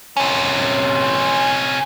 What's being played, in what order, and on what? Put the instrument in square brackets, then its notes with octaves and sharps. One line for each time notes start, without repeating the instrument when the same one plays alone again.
[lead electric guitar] C3 C#4